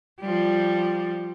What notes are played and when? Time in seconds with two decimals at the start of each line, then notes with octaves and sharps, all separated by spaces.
0.21 F3 G3